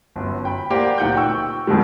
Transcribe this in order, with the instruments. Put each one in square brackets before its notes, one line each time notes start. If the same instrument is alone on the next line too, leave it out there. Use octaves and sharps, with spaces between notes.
[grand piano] G1 F#2
G5 B5
A#3 G4 C5 D5 F#5
D1 A#2 D#4 F#5 G5 G6
G5 C#6 E6
F2 G#2 B2 D#3 G3